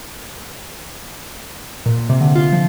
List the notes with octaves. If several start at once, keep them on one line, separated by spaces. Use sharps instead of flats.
A#2
C3
D3
F4
F3